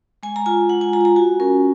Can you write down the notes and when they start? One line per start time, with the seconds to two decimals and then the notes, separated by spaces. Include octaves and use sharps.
0.23 G#3 G#5
0.36 A#5
0.46 F4 G#5
0.69 G#3 F#5
0.81 G#5
0.93 F4 A#5
1.01 G#5
1.05 A#5
1.16 F#4 G#5
1.40 C#4 A#4